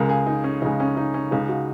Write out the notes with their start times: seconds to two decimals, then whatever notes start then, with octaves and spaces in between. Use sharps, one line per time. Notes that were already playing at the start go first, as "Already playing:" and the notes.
Already playing: C#2 C#3 G#3 A#4
0.09 G#4
0.26 D#4
0.44 C#4
0.62 C#2 C#3 G#3 D#4
0.80 C#4
0.97 D#4
1.14 C#4
1.31 C#2 C#3 G#3 D#4
1.49 F#4